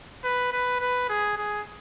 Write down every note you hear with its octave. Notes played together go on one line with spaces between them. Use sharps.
B4
B4
B4
G#4
G#4